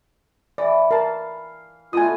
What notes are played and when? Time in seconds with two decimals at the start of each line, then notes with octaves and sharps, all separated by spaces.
0.58 E3 D5
0.91 A#4 F5 A5
1.93 B2 D3 A3 F4 G#5 D#6